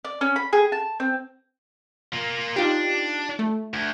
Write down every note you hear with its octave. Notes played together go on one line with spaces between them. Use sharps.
D5
C#4
B5
G#4
A5
C4
A#3 F4
D4 D#4 F4 G4
A3
D2